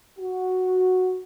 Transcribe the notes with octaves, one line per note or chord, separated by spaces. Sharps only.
F#4